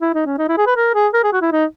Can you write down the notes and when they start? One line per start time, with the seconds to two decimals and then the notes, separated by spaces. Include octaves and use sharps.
0.01 E4
0.14 D#4
0.26 C#4
0.38 D#4
0.49 E4
0.57 G#4
0.67 B4
0.76 A#4
0.95 G#4
1.14 A#4
1.24 G#4
1.32 F#4
1.42 E4
1.52 D#4